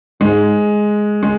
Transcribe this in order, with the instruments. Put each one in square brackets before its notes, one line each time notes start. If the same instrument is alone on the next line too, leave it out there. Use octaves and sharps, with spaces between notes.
[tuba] G#2 [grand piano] G#3
[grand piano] G#3